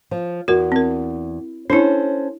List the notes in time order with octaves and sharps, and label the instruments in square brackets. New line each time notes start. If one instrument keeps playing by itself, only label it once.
[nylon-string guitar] F3
[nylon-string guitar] E2 [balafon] F#4 A#4
[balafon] C4 A#4
[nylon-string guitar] C#4 A4 C5 [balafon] D4 E4